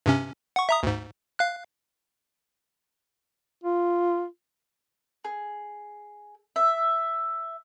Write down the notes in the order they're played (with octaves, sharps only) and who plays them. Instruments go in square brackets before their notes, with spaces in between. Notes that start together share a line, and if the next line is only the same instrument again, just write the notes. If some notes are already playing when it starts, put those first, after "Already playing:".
[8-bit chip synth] G2 C3 C#4
F#5 C#6
E5 A#5 D#6
D2 G#2
F5 F#6
[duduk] F4
[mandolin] G#4
E5